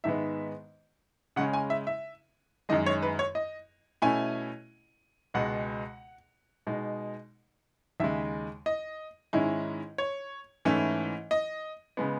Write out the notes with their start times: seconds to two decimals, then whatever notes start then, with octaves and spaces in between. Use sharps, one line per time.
0.04 G#2 D#3 G#3 B3 E5
1.36 C#3 G#3 C#4 F#5
1.53 G#5
1.70 E5
1.87 E5
2.69 F#2 D#3 G#3 D#5
2.86 C#5
3.02 B4
3.19 C#5
3.35 D#5
4.02 B2 A3 C#4 E4 G#5
5.34 C#2 B2 G#3 F#5
6.67 B2 G#3 D#4
8.00 D#2 C#3 G#3 E5
8.66 D#5
9.33 G#2 D#3 G#3 C#4 E4
9.98 C#5
10.65 G#2 E3 A3 C#4 E4
11.31 D#5
11.97 C#3 G#3 B3